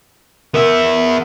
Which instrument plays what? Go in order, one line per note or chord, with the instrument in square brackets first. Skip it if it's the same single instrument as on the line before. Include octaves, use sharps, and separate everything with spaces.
[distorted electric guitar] B3 E5 [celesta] A#4